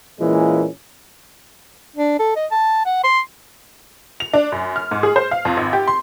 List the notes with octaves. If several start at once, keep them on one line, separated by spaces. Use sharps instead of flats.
A#2 E3 G#3 A#3 C#4
D4
A4
D#5
A5
F#5
C6
F7
D4
F#2
F6
G#2
G#4
C5
F5
F2
G#1
G4
C6